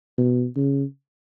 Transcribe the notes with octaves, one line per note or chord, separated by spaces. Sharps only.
B2
C#3